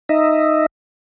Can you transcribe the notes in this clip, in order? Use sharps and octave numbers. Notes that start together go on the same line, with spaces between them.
D#4 D#5 E5